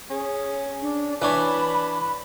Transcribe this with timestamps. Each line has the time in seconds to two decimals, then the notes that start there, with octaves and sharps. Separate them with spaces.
0.10 C#4 G#4
0.82 D4
1.22 E3 D4 B4 C#5 B5